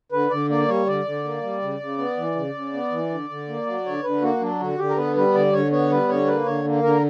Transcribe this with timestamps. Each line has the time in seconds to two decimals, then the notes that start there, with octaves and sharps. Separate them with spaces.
0.12 D3 B4
0.30 D3 D5
0.49 A#3 D5
0.68 G3 C#5
0.87 D3 D5
1.05 D3
1.24 A#3
1.43 G3
1.62 C#3
1.80 C#3
1.98 B3
2.17 E3
2.35 C#3
2.54 C#3
2.73 B3
2.92 E3
3.10 D3
3.29 D3
3.48 A#3
3.66 F#3
3.86 D3 C#5
4.03 D3 B4
4.22 A#3 F#4
4.40 F#3 D4
4.60 D3 F#4
4.78 D3 G4
4.90 A#4
4.97 B3 B4
5.16 G3 B4
5.34 D3 D5
5.53 D3 C#5
5.71 B3 C#5
5.91 G3 B4
6.09 D3 C#5
6.27 A#3 B4
6.46 D3 C#5
6.64 A#3
6.83 D3 A#4